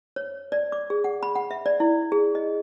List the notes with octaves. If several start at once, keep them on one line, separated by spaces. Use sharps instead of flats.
C#5
D5
D6
G#4
F#5
B5
F#5
E5
D5
E4
G#4
D#5